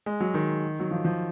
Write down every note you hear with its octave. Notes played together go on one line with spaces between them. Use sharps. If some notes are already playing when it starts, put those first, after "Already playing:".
G#3
F#3
D#3
F#3
F3
F3